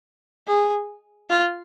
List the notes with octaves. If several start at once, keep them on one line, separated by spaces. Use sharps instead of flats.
G#4
F4